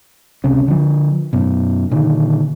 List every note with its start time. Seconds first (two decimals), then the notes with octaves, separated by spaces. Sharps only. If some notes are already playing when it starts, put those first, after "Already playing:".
0.44 C#2 C3 C#4
0.68 D3 F3
1.33 F#2 B2
1.91 A#2 D3 D#3